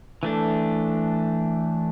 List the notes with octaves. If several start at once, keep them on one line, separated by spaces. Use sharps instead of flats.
E3 A3 D4